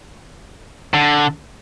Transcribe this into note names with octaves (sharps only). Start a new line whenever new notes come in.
D3